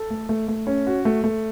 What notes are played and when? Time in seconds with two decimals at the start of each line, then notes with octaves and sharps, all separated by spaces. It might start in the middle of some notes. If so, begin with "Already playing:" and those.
Already playing: A4
0.10 A3
0.29 A3
0.48 A3
0.67 C#4
0.87 F#4
1.05 A3
1.24 A3